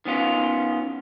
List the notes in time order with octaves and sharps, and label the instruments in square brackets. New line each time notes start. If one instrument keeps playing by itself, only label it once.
[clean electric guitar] D#3 B3 C#4 F4